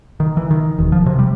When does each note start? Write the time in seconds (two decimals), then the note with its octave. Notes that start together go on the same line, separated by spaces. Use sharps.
0.20 D#3
0.37 E3
0.51 D#3
0.78 E1
0.92 F3
1.06 C3
1.19 G3